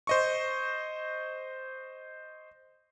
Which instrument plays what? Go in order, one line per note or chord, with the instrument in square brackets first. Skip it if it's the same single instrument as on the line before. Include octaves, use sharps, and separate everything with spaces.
[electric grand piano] C5 D#5 C#6